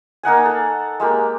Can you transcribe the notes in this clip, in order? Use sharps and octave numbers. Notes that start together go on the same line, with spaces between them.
A#3 D#4 F#5 G#5
A4
G#3 A#3 G4